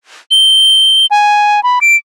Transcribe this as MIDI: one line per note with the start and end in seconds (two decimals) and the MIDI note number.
0.31 1.06 103
1.11 1.63 80
1.63 1.79 83
1.81 1.96 98